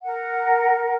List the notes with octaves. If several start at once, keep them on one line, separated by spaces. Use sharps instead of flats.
A#4 F#5